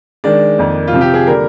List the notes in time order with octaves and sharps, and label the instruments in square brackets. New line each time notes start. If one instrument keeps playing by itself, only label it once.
[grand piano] D#3 G#3 D4 D5
F2 D#3 A#3 D#4
F4
C3 F3 C4
G4
G#4
D3 G3 A#3 A#4